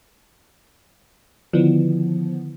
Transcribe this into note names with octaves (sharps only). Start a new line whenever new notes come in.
D3 D#3 F3 B3 E4